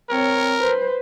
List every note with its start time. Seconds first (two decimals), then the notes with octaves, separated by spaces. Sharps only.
0.10 C4 A#4 C#5
0.60 B4 C5